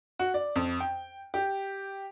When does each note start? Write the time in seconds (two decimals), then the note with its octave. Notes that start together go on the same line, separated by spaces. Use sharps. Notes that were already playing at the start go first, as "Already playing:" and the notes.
0.19 F#4
0.34 D5
0.56 F2
0.80 G5
1.34 G4